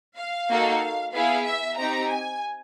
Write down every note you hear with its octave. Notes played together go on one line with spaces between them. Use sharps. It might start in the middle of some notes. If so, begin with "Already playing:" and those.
F5
A#3 D#4 F#4 A4
B3 E4 G#4 F5
E5
C4 D#4 G4 A#5
G#5